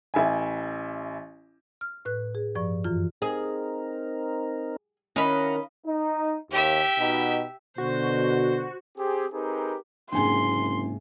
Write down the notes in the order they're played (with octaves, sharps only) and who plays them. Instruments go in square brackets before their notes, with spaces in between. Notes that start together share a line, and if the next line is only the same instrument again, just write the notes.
[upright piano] A1 E5 G#5
[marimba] F6
A2 B4 F#6
G#4
G2 F3 D5 C#6
F#2 E3 F4
[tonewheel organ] C4 D#4 A#4 [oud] G#4
[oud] D#3 C#4 [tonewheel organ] E4 F#5 A#5 [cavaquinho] D#5 F5 B5
[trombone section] D#4
[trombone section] D#2 [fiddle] G4 E5
[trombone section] B2 D#4
[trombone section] B2 D3 [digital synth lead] F#4 [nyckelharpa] C5
[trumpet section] C4 G4 G#4
C4 D#4 G4 G#4 A#4 B4
[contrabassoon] F#1 [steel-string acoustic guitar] G#2 C3 A#3 [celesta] D4 G#5 [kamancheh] C6